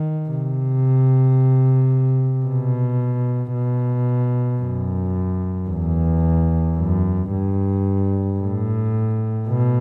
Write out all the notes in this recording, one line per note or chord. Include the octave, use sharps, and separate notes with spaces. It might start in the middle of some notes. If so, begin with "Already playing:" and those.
Already playing: D#3
C3
B2
B2
F#2
E2
F#2
G2
A2
B2